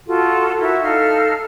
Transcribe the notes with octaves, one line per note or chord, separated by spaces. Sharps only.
F4 F#4 A4
E4 F#4 A#4 E5
D#4 A4 F5 F6